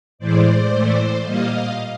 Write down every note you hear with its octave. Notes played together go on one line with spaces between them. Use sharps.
A2 E3 G#3 C5 D5
A2 E3 A3
A#2 G3 A#3 D#5 F5